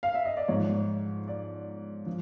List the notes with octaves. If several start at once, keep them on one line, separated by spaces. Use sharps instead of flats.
F5
E5
D#5
D5
G#2 F3 C#5
D5
F3